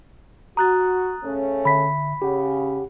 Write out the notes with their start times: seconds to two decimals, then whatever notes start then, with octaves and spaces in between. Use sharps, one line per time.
0.57 F#4 A#5 D#6 F#6 A6
1.24 C#3 A3 C#4
1.65 D3 E5 B5 B6
2.22 C#3 G4 F#5